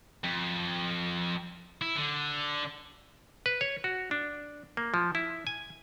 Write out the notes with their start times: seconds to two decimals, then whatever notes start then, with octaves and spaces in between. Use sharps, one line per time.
0.24 F2
1.81 E4
1.96 D3
3.46 B4
3.61 C#5
3.84 F#4
4.11 D4
4.77 A#3
4.94 F3
5.15 E4
5.47 G#5